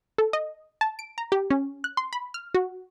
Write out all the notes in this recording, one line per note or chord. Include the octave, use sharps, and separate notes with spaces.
A4
D#5
A5
D7
A#5
G4
C#4
F#6
C6
B5
F6
F#4